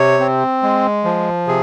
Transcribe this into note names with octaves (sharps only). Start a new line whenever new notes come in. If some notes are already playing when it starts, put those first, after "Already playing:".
Already playing: C3 C#5
C4
G#3
F3
C3 G#4